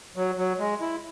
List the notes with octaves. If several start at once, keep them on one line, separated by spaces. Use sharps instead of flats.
F#3
F#3
G#3
E4